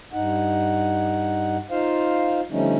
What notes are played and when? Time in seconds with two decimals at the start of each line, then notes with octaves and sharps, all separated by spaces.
0.13 G2 D#4 F#5
1.71 D#4 F4 C5 F5
2.51 D3 F3 G3 A3 C#4 D#4